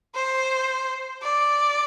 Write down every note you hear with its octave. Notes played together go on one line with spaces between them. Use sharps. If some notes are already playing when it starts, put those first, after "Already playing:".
C5
D5